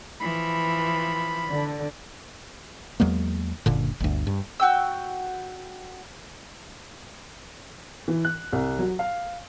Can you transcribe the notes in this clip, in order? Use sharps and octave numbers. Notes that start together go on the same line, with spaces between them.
E3 F3 B5
D3
E2 F#3 G#3 A#3
F#1 A#2 D3
G1 D2
G2
F#4 G5 E6
E3
F#6
C2
F#3
F5